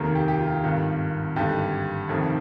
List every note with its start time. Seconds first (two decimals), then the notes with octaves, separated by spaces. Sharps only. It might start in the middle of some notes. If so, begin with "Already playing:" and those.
Already playing: F1 D#2 D#3 A#4
0.15 G4
0.28 G4
0.39 F4
0.64 G#1 G2 D#3
1.36 G#1 G2 D3 G4
2.09 F1 F2 D#3